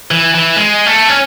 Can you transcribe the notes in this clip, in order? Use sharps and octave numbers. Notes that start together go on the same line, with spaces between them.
E3
E3
G#3
A3
C#4